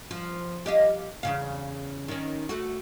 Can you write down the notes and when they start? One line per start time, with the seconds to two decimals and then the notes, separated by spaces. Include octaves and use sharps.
0.11 F3
0.66 G4 D#5 F5
1.23 E2 C#3 F5
2.08 D#3 C#4
2.49 A3 F#4